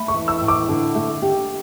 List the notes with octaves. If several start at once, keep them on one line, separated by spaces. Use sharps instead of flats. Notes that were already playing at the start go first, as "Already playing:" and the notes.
Already playing: A3 B5
C#6
E3
E6
A2
D6
D3
A3
G4